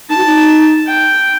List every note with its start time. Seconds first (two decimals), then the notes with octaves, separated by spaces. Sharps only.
0.09 D#4 A5
0.17 F#4
0.26 D#4
0.87 G5